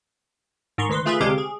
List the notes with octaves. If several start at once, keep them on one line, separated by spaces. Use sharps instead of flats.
G#2 D#3 A#5 C6 C#6
D2 D#3 B4 C6
A3 F4 G#4 B4 E5 C6
D2 C3 G#3 G4 F5 D6
G#4